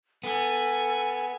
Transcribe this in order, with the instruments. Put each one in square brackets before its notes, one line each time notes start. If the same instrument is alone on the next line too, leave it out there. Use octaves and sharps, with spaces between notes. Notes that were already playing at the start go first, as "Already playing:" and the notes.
[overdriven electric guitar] B3 [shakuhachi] A4 [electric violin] G#5